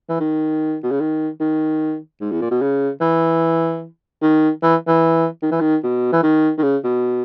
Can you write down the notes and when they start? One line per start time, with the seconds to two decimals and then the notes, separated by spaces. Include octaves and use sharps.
0.09 E3
0.20 D#3
0.83 B2
0.91 C#3
1.00 D#3
1.40 D#3
2.21 G#2
2.31 E2
2.41 A#2
2.51 B2
2.61 C#3
3.01 E3
4.22 D#3
4.63 E3
4.87 E3
5.42 D#3
5.51 E3
5.61 D#3
5.84 B2
6.13 E3
6.23 D#3
6.58 D#3
6.63 C#3
6.84 B2